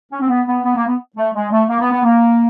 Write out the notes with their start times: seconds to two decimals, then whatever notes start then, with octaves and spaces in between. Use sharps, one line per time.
0.12 C#4
0.21 C4
0.29 B3
0.47 B3
0.64 B3
0.76 A#3
0.87 B3
1.16 A3
1.35 G#3
1.51 A3
1.69 A#3
1.80 B3
1.92 B3
2.04 A#3